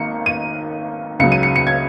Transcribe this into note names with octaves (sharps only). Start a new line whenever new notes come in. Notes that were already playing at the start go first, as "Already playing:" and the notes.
Already playing: G#1 D#3 A#3 C#7
D#7
C#2 C#3 F#3 C#7
D#7
C#7
C#7
G#6